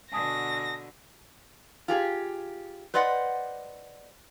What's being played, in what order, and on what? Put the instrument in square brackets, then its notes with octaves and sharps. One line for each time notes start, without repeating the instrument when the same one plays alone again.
[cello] B2 D3 [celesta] G#5 A5 D#6 [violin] A#6
[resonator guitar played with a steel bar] F4 G4 G#4
B4 C5 D5 D#5 F#5